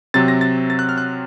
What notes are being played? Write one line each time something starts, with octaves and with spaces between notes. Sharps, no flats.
C3 F#3 C4 A6
A#6
A6
A6
F#6
F6
F#6